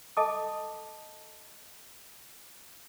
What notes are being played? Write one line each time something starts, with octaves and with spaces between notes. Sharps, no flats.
A4 D#5 A5 D6 D#6